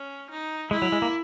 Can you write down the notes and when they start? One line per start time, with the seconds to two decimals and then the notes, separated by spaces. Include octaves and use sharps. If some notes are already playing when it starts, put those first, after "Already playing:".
Already playing: C#4
0.30 D#4
0.71 G#3 E4
0.82 F#3
0.92 G#3
1.02 A#3